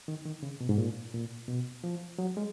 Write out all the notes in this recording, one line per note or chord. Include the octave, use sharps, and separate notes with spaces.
D#3
D#3
C#3
B2
G#2
A#2
A#2
B2
F3
F#3
G#3